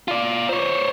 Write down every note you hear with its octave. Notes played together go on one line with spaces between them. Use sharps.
F4 D5
C5 C#5